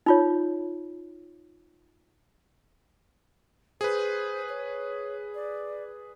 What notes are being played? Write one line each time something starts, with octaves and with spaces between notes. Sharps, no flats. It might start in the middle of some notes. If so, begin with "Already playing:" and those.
D#4 F4 C#5
G#4 B4 C5
C#5
D5